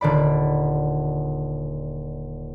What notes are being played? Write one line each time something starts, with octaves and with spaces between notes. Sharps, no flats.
D#1 D3 D5 B5